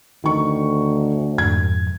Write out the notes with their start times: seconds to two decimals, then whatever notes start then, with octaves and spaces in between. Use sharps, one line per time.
0.24 D2 D#3 C#6
1.38 F2 G#2 G#6